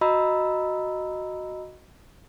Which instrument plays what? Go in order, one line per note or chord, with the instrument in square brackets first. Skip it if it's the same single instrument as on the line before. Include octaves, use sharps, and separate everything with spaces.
[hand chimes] F#4 D#5 A#5 B5 E6